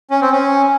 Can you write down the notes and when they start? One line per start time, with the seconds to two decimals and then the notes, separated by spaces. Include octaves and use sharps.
0.10 C#4
0.21 C4
0.32 C#4